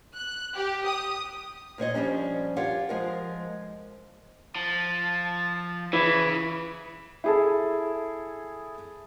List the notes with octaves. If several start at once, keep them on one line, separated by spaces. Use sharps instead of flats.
F#6
G4
D#6
A#2 C4 C#5 D#5
F3 G3 C#4 D4
F4 G4 A#4 C#5 F5 F#5
F3 G#3 A#4
F3 A5
C#3 E3 B5
E4 G#4 A4